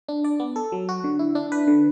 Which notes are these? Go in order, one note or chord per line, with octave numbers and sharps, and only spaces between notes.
D4
D5
B3
A4
F#3
F#4
D3
E4
D4
B4
D3